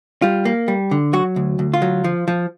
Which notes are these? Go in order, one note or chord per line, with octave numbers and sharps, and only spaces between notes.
G3 F4
A#3
G3
D3
F#3 F#4
D2
D2
F4
F#3
F3
F3